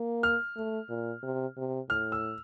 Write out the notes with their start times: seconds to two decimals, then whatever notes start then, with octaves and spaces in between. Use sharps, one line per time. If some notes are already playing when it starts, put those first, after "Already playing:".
Already playing: A#3
0.23 F6
0.56 A3
0.89 A#2
1.23 C3
1.57 C3
1.89 A2 F6
2.12 E6